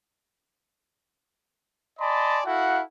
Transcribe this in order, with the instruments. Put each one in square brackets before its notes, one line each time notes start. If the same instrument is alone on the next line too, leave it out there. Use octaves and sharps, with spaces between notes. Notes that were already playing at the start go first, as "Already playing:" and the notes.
[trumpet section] D5 D#5 G#5 A5 B5 C6
E4 F#4 A4 F5 F#5